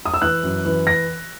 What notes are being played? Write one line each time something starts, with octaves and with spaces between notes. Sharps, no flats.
D#6
E6
E3 F#6
F#2
E3
A#6